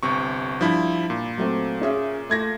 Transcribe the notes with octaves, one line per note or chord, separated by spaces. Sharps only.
G1 C3 C#6
G2 F3 E4
A#2
F#3 A3 C4
C#4 G#4 E5
A3 G#6 A#6